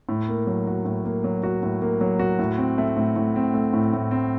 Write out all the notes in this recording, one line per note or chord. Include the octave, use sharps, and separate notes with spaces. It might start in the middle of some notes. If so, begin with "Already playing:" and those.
A2
A#3
F#3
F#4
A2
A#3
F#3
F#4
A2
A#3
F#3
F#4
A2
C4
A3
A2
A2
C4
A3
A2
A2
C4